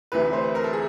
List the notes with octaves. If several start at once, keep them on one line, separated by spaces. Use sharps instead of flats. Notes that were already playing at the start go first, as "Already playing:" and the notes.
D2 C3 E3 B4
C5
A#4
A4
G#4